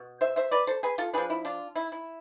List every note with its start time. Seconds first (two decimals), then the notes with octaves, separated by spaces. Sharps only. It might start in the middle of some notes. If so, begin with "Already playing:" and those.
Already playing: B2
0.21 C5 E5
0.36 C5 E5
0.51 B4 D5
0.67 A4 C5
0.83 G#4 B4
0.98 F4 A4
1.13 F3 B3 D4 G#4 B4
1.30 E4
1.45 D4 F4
1.76 E4
1.92 E4